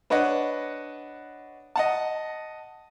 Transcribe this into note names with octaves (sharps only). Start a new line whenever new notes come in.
D4 B4 C#5 D#5 F#5
D#5 F#5 A5